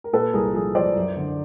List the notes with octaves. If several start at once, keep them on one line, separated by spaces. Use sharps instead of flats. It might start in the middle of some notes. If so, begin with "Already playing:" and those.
A#4
A#2 A4 B4
C2 G#4 A#4
F3 G#4
F3 C5 D5
F#2
D3